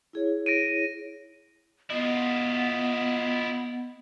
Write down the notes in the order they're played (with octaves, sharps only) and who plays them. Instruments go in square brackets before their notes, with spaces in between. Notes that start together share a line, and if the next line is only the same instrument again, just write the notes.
[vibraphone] E4 G#4 C#5
[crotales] A#6 D7 D#7
[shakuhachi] B3 [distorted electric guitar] E4 F4 [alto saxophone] D#5